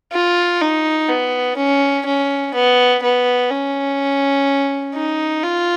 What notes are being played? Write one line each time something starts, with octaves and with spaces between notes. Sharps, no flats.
F4
D#4
B3
C#4
C#4
B3
B3
C#4
D#4
F4